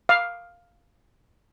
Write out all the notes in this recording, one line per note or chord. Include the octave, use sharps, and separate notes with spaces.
F5